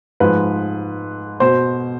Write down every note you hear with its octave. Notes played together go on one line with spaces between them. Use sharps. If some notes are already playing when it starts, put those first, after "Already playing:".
G#2 F3 B4
B2 C5